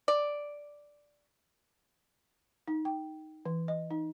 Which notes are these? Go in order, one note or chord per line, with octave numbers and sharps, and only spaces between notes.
D5
D#4
G5
E3
D#5
D#4